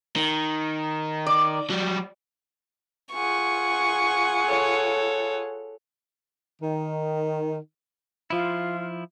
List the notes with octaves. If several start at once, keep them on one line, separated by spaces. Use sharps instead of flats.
D#3
D5
F#3 G3
F4 G#4 F#5 C#6
A4 C#5
D#3
F3 E4 F4